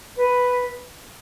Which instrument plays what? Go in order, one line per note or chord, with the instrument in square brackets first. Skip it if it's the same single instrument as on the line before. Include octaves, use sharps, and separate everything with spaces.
[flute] B4